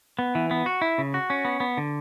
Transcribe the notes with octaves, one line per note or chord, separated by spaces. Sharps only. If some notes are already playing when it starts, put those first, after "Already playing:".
B3
E3
B3
F#4
E4
C#3
F#4
C#4
B3
B3
D3